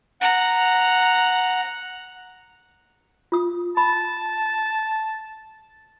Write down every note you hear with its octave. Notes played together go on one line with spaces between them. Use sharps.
F#5 A#5
F4 D#6
A5 B5